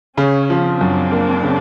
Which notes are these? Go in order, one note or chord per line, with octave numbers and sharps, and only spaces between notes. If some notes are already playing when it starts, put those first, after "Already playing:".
C#3 C#4
F3
C4 D4
F#2
A#3
C#3